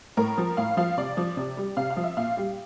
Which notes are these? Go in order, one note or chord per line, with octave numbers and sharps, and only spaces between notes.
A2 A#4
F3
A2 F5
F3 F5
C3 D5
F3
C3
G3
C3 F5
F5
F3
E5
A#2 F5
G3